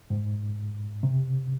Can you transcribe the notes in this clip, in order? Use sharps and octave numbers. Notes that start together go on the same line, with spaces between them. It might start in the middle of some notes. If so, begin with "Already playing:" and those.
G#2
C3